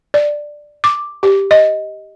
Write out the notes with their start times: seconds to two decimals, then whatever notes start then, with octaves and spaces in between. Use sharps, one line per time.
0.14 D5
0.84 D6
1.23 G4
1.51 D#5